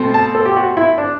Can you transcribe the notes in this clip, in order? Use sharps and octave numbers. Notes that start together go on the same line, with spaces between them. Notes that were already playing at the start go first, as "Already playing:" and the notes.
Already playing: B2 A3 C4
A5
A4
G4
F#4
E4
D4